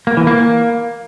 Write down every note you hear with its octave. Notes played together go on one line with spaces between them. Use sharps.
A#3
E3
A#3